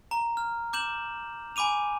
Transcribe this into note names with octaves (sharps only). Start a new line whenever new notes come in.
A#5
F6
D6 G6 E7 F#7
G#5 B5 D6 D#7 F7